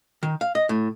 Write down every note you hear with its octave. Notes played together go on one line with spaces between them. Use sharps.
D#3
F5
D#5
A2